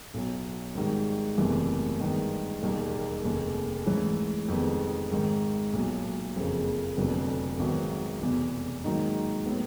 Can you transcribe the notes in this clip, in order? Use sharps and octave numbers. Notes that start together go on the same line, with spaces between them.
B1 B2 F#3
G#1 G#2 D#3 G3
F#1 E2 C3 E3 A3
G2 D#3 G#3 B3
E1 D#2 D#3 G3 A#3
F1 D#2 C#3
G#2 E3 A3 C#4 E4
F2 C3 D#3 G#3 B3
G#1 G#2 D#3
B1 A#2 F#3
F#1 F2 C#3 F3 A#3
F1 F2 D3 F#3 B3
G#1 G#2 D#3 F#3 B3
F1 E2 B2
G#2 D#3 F#3 A#3 D#4
A2 F#3 B3